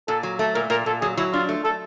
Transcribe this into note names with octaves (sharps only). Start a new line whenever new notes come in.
A#2 A4
F#3
A3 A4
A#2 A#4
A#2 A#4
A#2 A4
F#3 G#4
F#3 E4
D4 F4
A3
A3 A4